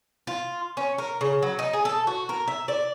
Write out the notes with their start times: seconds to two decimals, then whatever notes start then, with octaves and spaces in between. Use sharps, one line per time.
0.27 F4
0.77 C#4
0.98 A#4
1.21 C#3
1.42 F#3
1.59 D#4
1.73 G#4
1.85 A4
2.07 F#4
2.29 A#4
2.48 E5
2.68 D5